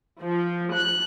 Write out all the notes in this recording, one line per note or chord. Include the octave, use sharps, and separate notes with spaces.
F3
F#6